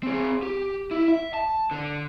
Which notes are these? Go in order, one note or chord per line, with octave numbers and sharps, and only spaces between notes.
C4 G#4
G4
E4
E5
A5
D3